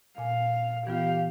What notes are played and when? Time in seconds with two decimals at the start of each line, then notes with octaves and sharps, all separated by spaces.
0.18 A#2 F5 G#5
0.87 E3 B3 F4 G4 F5